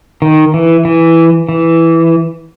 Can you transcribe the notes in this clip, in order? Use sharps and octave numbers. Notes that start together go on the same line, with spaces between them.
D#3
E3
E3
E3